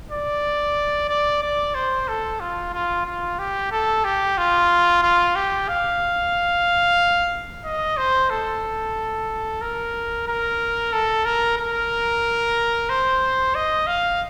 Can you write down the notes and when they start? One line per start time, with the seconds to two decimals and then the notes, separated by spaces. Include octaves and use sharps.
0.11 D5
1.09 D5
1.43 D5
1.75 C5
2.08 A4
2.40 F4
2.73 F4
3.06 F4
3.39 G4
3.72 A4
4.05 G4
4.38 F4
5.03 F4
5.35 G4
5.69 F5
7.65 D#5
7.97 C5
8.30 A4
9.61 A#4
10.27 A#4
10.93 A4
11.25 A#4
11.58 A#4
12.90 C5
13.55 D#5
13.87 F5